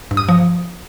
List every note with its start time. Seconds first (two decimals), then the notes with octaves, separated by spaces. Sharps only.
0.11 G2
0.17 D#6
0.29 F3